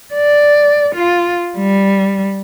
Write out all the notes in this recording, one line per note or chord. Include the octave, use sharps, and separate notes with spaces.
D5
F4
G3